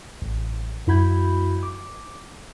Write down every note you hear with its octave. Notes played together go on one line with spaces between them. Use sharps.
A1
F#2 E4 F#4 B5 G6 G#6
D6